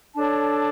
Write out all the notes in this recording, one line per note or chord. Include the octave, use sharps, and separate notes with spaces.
D4 A4 C#5 A5